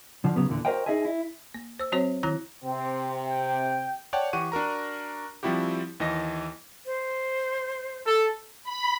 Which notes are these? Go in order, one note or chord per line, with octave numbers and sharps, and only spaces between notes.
D3 F3
C#3 F#3 B3
E2 A#2 D3
F#4 A#4 C5 D#5 F5 G5
D#4 G#4 D#5 E5 G#5
E4
A#3
C5 E6
F#3 C4 F#4 C5 C#5
D#3 E4 A#5 F#6 A#6
C3 C4
G5
C#5 D5 F#5 G5 A5
E3 G4 F#5 C#6 D#7
D4 F#4 A#4 A#5
F3 G3 C4 E4 F#4 G4
D#2 E3 D#5 A#6
C5
A4
B5